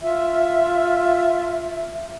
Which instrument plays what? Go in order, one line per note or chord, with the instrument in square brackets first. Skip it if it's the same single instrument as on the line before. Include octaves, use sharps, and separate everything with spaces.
[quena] F4 [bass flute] E5